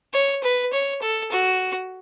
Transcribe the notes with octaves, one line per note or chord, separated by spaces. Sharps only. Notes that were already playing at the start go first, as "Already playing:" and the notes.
C#5
B4
C#5
A4
F#4